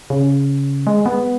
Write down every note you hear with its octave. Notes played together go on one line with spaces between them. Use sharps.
C#3
G#3
B3